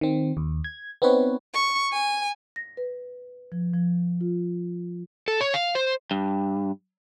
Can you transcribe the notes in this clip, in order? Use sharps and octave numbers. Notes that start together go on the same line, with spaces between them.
D#3 C4
D#2
G#6
B3 C4 D#4 B4 C#5
C#6
G#5
A#6
B4
F3
F3
F4
A4
C#5
F5
C5
G2